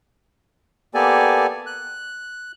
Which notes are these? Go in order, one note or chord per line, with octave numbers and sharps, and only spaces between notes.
A#3 B3 G4 A4 D5 G#5
F#6